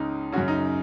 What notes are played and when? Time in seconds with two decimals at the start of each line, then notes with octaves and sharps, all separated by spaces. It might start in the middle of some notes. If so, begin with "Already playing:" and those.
Already playing: C#2 C#3 D#4
0.33 C#3 F#4
0.37 F#2
0.48 D#4